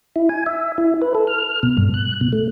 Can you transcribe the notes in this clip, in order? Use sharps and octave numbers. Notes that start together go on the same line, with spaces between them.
E4
G#5
E5
E4
B4
A4
F6
B2
G2
F#6
B2
A3